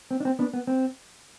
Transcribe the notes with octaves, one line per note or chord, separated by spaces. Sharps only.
C4
D4
C4
B3 D4
B3
C4